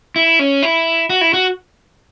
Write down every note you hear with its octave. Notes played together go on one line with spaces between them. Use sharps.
E4
C#4
E4
F#4
E4
F#4